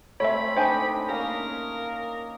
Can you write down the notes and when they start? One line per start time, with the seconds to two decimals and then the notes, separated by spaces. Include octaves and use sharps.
0.20 A3 C4 C#5 E5 G#5 B5
0.57 D4 D#4 C5 D#5 G5 G#5
1.09 A#3 C#4 G#4 A#4